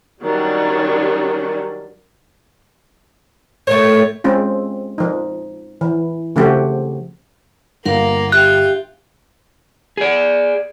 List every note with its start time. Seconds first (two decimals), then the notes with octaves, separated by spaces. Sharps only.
0.22 D#3 F#3 G3 C#4 D4
3.67 A2 A3 C#5
4.24 G#3 C4 C#4 F4
4.98 F3 D#4
5.81 E3
6.36 C#3 F3 A3 C4 F#4 G4
7.85 G1 A#3 A#4 F5 F#5
8.32 F4 G4 E5 G5 F#6
9.97 G#4 D5